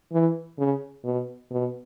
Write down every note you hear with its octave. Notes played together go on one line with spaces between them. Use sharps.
E3
C#3
B2
B2